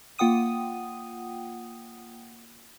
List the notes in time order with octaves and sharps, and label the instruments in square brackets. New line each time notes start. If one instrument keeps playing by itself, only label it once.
[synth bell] A#3 F4 F#5 G5 D#6 D#7